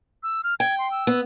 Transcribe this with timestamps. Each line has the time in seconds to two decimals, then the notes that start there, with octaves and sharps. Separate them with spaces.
0.23 E6
0.44 F6
0.60 G5 G#6
0.79 C6
0.91 E6
1.07 B3